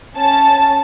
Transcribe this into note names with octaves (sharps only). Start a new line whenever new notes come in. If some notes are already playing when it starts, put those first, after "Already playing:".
C#4 A5